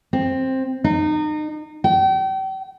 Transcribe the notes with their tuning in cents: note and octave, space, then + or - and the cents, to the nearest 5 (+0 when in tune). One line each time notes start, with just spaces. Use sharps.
C4 +10
D#4 -30
G5 -40